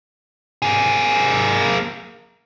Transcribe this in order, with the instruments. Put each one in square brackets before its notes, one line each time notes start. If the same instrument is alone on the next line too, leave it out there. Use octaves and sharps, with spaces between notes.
[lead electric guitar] A#3 G#4